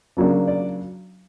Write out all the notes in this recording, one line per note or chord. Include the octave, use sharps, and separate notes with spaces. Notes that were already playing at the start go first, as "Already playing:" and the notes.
C#3 F#3 A#3 D4
D5